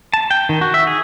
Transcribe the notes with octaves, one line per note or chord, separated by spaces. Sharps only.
A5
G5
D#3
F#4
E5
G#4